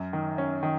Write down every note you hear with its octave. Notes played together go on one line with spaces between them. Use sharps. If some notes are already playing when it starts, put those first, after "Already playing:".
Already playing: F#2
D#3
C#4
D#3